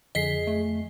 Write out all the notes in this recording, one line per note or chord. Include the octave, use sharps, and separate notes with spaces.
F2 D3 G#4 D#5 B6 C7
A3